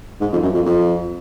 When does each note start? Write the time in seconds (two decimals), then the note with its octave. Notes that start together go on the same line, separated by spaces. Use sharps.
0.21 G#2
0.32 F2
0.43 F#2
0.54 F2
0.66 F2